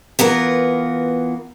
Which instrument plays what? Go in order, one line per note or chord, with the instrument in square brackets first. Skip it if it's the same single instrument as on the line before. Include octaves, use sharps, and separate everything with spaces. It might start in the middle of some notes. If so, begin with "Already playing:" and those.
[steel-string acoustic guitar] E3 B3 F4 A#4